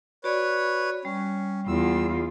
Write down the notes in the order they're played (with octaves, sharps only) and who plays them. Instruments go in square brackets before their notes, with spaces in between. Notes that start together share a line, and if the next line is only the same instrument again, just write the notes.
[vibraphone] F#4 D5 [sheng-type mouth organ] B4 C#5
[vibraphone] G3 [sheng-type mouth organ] C#4
[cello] E2 F4 [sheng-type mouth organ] E6